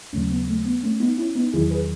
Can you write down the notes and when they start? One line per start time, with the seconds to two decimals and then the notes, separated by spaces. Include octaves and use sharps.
0.13 D#2 C#3 F#3 A3 C#4
0.30 B3
0.48 A3
0.65 B3
0.83 A3 C#4
1.00 B3 D#4
1.18 C#4 E4
1.35 B3 D#4
1.53 E2 D#3 F#3 E4 G#4
1.71 G#4 B4